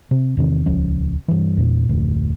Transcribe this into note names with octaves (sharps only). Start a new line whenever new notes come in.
C3
E2 C3 D#3
D#1 C#2 F3 C#4
G2 E3
E2 A#2
F1 D2 A2